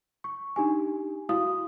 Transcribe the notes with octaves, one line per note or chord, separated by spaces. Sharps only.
C#6
D4 D#4 G4 G#5
E4 F#4 F5 D#6